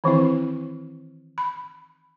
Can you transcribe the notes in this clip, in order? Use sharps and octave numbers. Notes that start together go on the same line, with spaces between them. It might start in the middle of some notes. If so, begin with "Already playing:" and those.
D#3 E3 C4 E4
B5